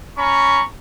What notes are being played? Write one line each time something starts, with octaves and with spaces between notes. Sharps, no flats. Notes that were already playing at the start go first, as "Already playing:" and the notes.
C#4 A#5 B5 C#6